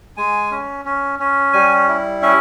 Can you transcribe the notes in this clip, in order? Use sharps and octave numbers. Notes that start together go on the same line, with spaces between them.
G#3 G#5
C#4
C#4
C#4
G3 G#5
E4
C#4 E5